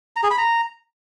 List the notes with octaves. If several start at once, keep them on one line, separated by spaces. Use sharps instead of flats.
A#5
G#4
B5
A#5